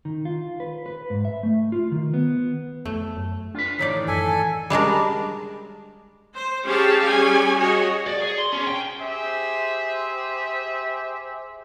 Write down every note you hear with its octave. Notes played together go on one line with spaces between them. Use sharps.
D#3
F4
B4
B4
G#2
E5
A3
F4
D#3
B3
F2 A3
F#2
D4 F4 B4
A2 D#3 E3 D#4 D5
F#2 A4 G#5
G3 G#3 D4 A#4
C5
C#4 G4 G#4 F5 G5 A5
G3 C#4 G#4 G#5
F#4 G#4 C#5 D#5
D5
G#4
C6
C#4
G5
G4 G#4 C5 E5